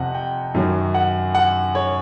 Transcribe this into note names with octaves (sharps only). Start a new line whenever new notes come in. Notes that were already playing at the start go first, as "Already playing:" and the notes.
Already playing: F2 C3 F#5
G5
F#2 D#3 F#3
F#5
F#5
C#5